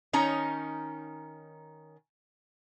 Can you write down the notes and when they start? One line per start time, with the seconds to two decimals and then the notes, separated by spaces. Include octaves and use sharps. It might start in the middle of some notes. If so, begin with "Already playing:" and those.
0.13 D#3 C#4 D#4 C#5 A#5